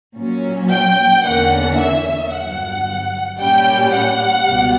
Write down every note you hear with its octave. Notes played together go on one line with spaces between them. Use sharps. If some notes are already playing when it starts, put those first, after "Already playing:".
A#2 F#3 C#4
G5
E2 D3 A#3 C#4 F#5
E5
G1 G2 F#3 F#5
A#2 G3 C#4 G5
F#5
C#2 B2 G3